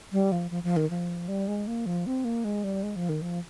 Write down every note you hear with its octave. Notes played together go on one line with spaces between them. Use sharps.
G3
F3
F3
F3
D#3
F3
G3
G#3
A#3
F3
C4
A#3
G#3
G3
G#3
F3
D#3
F3